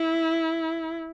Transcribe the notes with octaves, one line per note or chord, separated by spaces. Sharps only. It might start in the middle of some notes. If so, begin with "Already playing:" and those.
Already playing: E4